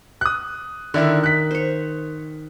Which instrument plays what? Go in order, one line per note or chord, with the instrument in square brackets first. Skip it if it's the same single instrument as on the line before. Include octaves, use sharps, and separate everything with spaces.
[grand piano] D#6 F#6
[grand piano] D3 D4 E4 [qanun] D#3 A#4
[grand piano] F#6 B6
[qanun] C5 C#5